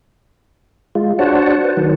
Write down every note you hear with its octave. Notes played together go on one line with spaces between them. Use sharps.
G#3 F4
D4 F#4 C5 C#5 F#5 A5
B4 C5
D#3 F#3